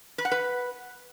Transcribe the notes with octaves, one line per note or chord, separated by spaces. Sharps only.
B4
F#5
B4